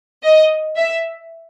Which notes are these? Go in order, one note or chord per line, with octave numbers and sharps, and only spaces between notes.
D#5
E5